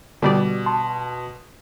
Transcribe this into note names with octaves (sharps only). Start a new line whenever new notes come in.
B2 D3 G3 D5
A5 C6